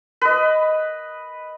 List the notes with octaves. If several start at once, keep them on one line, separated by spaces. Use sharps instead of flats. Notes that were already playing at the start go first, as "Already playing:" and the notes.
B4 D#5